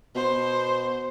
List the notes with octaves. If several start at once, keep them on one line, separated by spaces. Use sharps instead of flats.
B2 C5